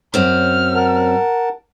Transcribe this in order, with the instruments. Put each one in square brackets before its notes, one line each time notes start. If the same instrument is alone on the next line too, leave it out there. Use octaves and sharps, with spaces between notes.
[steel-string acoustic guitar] F#2 C4 C#4 [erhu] F6
[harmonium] A#4 F#5 A5